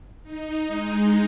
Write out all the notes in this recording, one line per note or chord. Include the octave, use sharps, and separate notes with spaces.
D#4
G#3